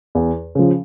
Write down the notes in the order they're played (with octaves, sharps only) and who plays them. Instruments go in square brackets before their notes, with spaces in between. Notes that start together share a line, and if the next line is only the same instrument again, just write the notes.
[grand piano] E2
C#3 F3